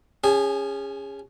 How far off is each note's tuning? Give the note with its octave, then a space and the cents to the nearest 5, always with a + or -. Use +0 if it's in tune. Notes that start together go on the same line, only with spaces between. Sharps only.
C#4 +0 G#4 -30 G#5 +40